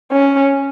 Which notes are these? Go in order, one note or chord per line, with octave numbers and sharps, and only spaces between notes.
C#4